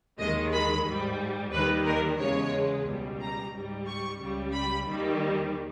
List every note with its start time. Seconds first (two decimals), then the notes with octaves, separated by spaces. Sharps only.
0.19 D#2 D#3 G#3 D#5
0.53 B5
0.87 G#2 G3
1.53 D#2 D#3 G3 B4
1.86 A#4
2.19 E2 C#3 G#3 C#5
2.86 C#2 B2 G3
3.20 A#5
3.53 G#2 G3
3.87 C#6
4.20 C#2 C#3 G3
4.53 B5
4.87 D#2 D#3 G3